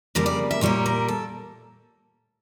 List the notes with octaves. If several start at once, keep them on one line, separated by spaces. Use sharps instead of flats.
F2 C#3 G3 A#3 A#4
D5
E5
A#2 G3 A#3 C#5
A#4
A4